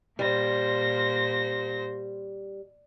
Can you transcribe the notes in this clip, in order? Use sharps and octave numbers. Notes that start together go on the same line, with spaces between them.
A#2 G3 C5 A#6